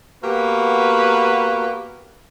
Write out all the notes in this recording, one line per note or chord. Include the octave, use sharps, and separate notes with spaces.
A#3 B3 F#4 G4 B4